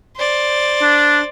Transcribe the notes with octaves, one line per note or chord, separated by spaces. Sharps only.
C5 D5
D4